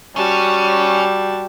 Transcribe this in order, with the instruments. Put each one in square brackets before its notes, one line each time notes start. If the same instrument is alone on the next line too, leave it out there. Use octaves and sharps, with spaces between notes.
[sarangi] G3 [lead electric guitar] C#4 [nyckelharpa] F#4 A5